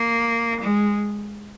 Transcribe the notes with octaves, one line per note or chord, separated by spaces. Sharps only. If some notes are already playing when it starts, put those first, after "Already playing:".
Already playing: A#3
G#3